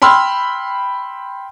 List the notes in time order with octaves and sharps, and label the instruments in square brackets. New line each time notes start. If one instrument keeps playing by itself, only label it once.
[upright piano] G5 B5 C6 E6 F6